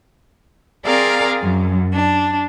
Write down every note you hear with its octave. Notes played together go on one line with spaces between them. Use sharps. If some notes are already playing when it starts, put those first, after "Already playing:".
C4 G#4 A#4 D5 F5
F#2
D4